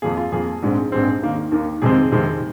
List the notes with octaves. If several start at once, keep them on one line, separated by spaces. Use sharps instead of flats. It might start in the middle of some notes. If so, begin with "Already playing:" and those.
F2 F3 A#3 G#4
F4
F2 F3 A#3 G#4
A#1 G#2 G#3 C4
A#1 G#2 G#3 C4
D#2 D#3 A#3
D#2 D#3 A#3
F2 C3 D#3 G#3 C4 G#4
F2 C3 D#3 G#3 C4